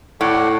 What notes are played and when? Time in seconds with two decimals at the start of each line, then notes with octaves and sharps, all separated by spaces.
0.20 A2 A4 D5 F#5